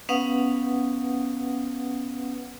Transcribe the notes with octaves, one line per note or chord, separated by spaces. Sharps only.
B3 C#4 B4 F5 F#5 D#6